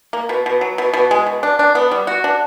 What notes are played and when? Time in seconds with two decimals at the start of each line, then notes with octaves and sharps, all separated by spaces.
0.13 A#3
0.29 B2
0.46 B2
0.61 F#3
0.78 B2
0.93 B2
1.11 G#3
1.26 B2
1.43 D4
1.59 D4
1.75 B3
1.91 G3
2.07 F#4
2.24 D4